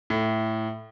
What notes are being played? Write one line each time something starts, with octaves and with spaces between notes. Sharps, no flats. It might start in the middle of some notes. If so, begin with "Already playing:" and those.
A2